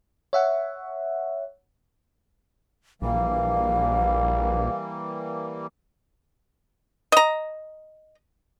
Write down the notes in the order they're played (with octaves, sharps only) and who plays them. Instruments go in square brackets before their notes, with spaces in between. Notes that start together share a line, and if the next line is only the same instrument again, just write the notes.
[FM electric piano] C#5 E5 F#5
[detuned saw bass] A#1 [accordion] E3 G3 A#3 [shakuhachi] F5
[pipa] D#5 A#5